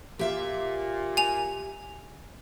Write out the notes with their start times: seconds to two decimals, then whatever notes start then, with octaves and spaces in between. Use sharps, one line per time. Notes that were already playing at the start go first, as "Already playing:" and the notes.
0.19 A#2 G4 E5 F5
1.17 G#5 F7